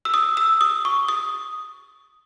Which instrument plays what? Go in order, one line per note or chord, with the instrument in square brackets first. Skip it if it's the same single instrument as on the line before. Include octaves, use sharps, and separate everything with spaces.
[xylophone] E6
D#6
E6
D#6
C#6
D#6